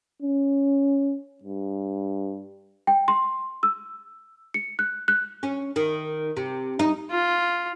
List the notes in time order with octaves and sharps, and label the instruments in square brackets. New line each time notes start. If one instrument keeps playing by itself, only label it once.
[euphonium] C#4
G2
[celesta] G5
C6
E6
C#7
F#6
F#6
[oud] C#4
D#3
C3
D#4
[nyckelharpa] F4